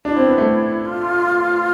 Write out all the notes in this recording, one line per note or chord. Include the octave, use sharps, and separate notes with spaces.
D4 E4
C4
B3
A3 C4
F4